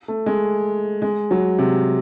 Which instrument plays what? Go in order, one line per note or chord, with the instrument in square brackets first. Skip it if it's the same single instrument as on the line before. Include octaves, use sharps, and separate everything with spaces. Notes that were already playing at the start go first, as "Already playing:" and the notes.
[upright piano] A3
G#3
G#3
F#3
C3